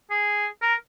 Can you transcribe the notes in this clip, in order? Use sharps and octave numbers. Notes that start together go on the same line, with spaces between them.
G#4
A#4